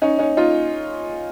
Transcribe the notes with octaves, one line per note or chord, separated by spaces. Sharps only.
C#4 D#4
C#4 D#4
D#4 F4